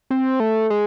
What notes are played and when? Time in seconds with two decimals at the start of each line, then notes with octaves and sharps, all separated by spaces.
0.11 C4
0.40 A3
0.70 G#3